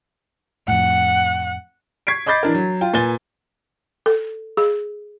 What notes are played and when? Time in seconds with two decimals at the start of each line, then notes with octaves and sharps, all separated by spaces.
0.68 F2 A2 F#5
2.07 C#6 G#6 B6 C7 D7
2.26 D#5 B5 D6 G6 A6 C7
2.43 E3 D4 A#4
2.55 F#3
2.81 F4 G5
2.94 A#2 B4 G#5 A6 G7
4.06 A4
4.57 G#4